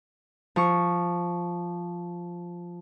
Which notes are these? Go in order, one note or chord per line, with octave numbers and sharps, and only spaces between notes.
F3 C#6